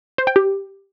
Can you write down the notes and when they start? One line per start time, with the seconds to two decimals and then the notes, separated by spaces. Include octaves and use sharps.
0.18 C5
0.27 G5
0.36 G4